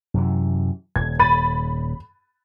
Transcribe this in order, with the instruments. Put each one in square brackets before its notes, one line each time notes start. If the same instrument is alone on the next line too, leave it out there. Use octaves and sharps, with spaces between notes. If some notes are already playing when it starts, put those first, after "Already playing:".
[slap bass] F#2 C3 E3
[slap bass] D#1 [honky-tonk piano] G#6
[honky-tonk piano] B5 A6 D#7